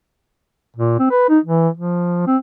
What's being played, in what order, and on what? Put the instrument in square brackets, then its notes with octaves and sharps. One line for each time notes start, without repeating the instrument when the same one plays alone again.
[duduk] A#2
C4
B4
D#4
E3
F3
C4